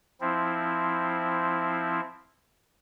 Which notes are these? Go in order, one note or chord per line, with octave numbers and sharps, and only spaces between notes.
F3 C4 E4